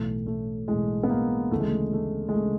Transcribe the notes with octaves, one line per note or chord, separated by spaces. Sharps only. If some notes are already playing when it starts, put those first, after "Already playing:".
Already playing: B1 A2 E3 A3
A3
B1 A2 E3 G#3
B3
A#3
D2 C#3 E3 A3
G#3
A3
A3
G#3
C#3 E3 A3